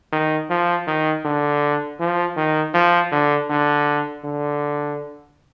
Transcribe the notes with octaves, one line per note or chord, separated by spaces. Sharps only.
D#3
F3
D#3
D3
F3
D#3
F3
D3
D3
D3